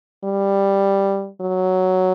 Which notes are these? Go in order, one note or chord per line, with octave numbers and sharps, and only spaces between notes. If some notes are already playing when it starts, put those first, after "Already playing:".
G3
F#3